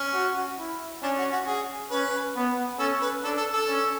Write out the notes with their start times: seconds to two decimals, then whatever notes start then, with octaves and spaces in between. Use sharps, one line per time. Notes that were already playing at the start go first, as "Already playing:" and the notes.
Already playing: C#4
0.14 F#4
0.59 E4
1.02 C#4 D4
1.18 F#4
1.33 F#4
1.47 G#4
1.91 C#4 B4
2.36 B3
2.79 C#4 A4
3.02 B4
3.24 D4 A4
3.38 A4
3.53 A4
3.68 C#4